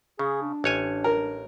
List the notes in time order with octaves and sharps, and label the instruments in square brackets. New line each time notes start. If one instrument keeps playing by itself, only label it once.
[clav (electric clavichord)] C#3 [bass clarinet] G#4
[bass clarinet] D4
[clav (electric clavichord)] A1 C#5 G#5
[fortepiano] A#4